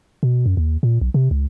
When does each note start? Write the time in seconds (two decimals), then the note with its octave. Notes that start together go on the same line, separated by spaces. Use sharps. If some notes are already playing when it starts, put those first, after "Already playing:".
0.23 B2
0.46 F#2
0.57 D#2
0.83 A#2
1.01 B1
1.14 C3
1.31 C#2